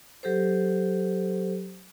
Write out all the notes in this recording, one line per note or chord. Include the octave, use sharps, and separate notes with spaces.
F#3 G4 A4 C5